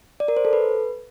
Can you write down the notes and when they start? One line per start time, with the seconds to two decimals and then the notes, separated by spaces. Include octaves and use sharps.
0.20 D5
0.28 A#4
0.37 C5
0.45 A4
0.53 B4